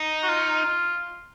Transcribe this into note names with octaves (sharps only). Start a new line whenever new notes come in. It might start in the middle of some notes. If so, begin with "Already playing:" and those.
Already playing: D#4
F#4
F4